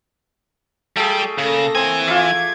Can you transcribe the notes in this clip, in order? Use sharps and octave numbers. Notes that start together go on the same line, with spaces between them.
G3 A3 G4 G#4
C#3 A#3 A4 A#6
E3 C4 G#5
F4 C#5 E5 D6 G#6